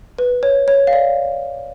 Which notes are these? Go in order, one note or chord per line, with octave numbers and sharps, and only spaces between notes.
B4
C#5
C#5
F5
D5